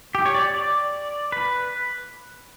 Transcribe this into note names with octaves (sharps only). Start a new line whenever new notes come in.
G4
C#5
D5
D5
B4